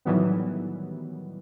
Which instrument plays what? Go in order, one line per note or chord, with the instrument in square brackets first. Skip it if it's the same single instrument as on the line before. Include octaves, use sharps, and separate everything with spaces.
[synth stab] A2 D#3 E3 F#3 G3 B3